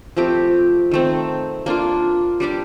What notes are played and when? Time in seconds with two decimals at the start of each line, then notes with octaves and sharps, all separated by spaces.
0.17 F3 A3 C4 G4
0.91 D#3 A3 C4
1.66 A#3 D4 F4
2.40 G3 D4 G4 D5